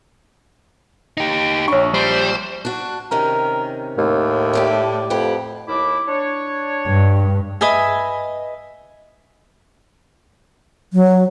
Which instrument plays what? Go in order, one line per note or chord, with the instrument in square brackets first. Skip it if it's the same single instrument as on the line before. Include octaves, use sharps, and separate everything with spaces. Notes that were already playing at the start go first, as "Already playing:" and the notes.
[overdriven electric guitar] D#4 G4
[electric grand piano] A#1 C#6 [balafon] D4 C#5
[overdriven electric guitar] G3 [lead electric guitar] C5
[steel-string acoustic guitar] D4 F#4
[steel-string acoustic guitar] C3 D#3 C#4 [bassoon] A#4
[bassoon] D#2 [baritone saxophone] A2
[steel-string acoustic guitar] G4 D5 E5
[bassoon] F2 [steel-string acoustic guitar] G4 B4 F#5
[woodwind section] D#2 E4 D6
D4 C#5
[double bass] G2
[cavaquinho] B4 D#5 E5 G#5
[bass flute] F#3